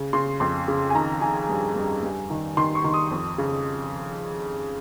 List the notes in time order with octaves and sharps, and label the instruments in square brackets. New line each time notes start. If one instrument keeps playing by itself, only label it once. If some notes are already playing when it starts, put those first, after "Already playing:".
Already playing: [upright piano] C#3
C#3 C6
F2 C6
C#3
G#5
D#3 A#5
D#3 G#5
G2
G2
G2
D#3
D#3 C6
C#6
D#3
D#6
F2
C#3